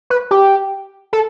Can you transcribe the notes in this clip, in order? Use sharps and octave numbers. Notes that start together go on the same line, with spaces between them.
B4
G4
A4